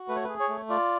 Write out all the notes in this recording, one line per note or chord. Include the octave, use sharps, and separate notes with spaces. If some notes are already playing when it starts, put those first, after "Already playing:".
Already playing: F#4
A3 B4
C#5
G#4 B4
C#5
A3
F4 D5